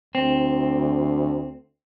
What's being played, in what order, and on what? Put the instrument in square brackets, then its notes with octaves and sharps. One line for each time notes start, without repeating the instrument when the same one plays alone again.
[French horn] D2 [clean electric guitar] C4